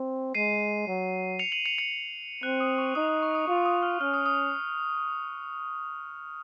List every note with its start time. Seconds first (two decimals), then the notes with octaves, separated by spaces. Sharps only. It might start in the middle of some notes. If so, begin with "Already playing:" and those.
Already playing: C4
0.35 G#3 C7 D#7
0.87 F#3
1.39 C#7 F7
1.52 D#7 F#7
1.66 C#7 F7
1.78 C#7 F7
2.43 C4 F#6
2.60 D#6
2.78 C#6
2.95 D#4 D#6
3.09 D#6
3.22 C#6
3.35 D#6
3.47 F4 C#6
3.66 D#6
3.83 F6
4.01 C#4 F6
4.14 D#6
4.26 D#6